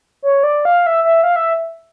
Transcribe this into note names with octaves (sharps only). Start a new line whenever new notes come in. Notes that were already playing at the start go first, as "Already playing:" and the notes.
C#5
D5
F5
E5
E5
F5
E5